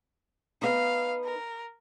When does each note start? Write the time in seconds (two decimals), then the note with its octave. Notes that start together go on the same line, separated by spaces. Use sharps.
0.62 B3 D#4 F5
1.24 A#4